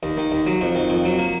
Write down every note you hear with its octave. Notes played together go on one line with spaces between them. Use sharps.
D#2
D#3
D#2
F#3
F2
D#3
F2
F#3
A#3